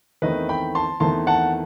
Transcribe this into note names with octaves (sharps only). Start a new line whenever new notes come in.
E2 D#3 A3 C4 B4 D#5
G5 B5
A5 C6
E2 D#3 A3 C4 A5 C6
F#5 A5